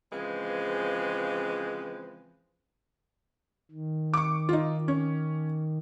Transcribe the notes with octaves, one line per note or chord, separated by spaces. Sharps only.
C#3 E3 F3 G#3 C4 B4
D#3
C#6 D6
D#4 F4
C#4